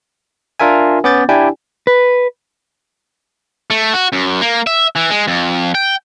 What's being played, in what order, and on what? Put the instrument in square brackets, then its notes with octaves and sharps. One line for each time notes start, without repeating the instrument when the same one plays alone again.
[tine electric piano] D4 F4 A#4 E5 G#5
B3 C#4 D6 G6 A6
D4 E4 G4 D5 G5 G#5
[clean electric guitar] B4
[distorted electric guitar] A3
F#4
F#2
A#3
E5
E3
G#3
F2
G5